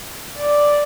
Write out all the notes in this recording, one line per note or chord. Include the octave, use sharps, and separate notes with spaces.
D5